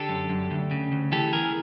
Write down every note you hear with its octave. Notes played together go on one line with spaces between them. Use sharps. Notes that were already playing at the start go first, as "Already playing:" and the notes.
Already playing: D3 G4 A4
F#2
F#2
D2
C#3
D2
E3 G4 A4
E2 G#4 A#4